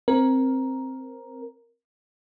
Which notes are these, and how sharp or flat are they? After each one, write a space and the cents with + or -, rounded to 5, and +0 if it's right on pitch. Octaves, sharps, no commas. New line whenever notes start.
C4 +0 A#4 +10